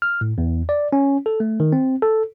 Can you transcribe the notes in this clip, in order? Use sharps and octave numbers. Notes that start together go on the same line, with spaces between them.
F6
A2
E2
D5
C#4
A4
A3
D#3
C4
A4